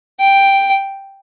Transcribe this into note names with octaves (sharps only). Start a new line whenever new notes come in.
G5